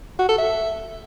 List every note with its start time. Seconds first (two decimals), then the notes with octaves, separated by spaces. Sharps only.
0.19 F#4
0.28 A4
0.38 E5